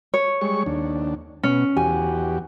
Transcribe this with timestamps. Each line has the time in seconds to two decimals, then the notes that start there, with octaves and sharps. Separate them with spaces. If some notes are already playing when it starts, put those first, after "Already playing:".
0.14 C#5
0.41 G3 G#3 C#6
0.66 D#2 D4
1.43 B2 C#4
1.77 E2 F#4 G4 G#5